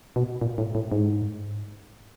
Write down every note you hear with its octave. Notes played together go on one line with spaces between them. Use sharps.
B2
A#2
A2
A2
G#2